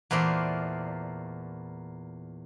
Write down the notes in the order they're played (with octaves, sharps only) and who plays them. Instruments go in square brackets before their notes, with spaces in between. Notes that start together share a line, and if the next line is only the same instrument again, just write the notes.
[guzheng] E2 A#2 A3 C5 D5